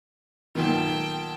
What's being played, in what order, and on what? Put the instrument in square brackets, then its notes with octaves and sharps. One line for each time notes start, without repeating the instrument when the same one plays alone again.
[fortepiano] B1 A#2 D#3 [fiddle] G5 A5